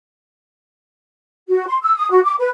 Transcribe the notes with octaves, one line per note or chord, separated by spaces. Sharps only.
F#4
C6
E6
D#6
F#4
D6
B4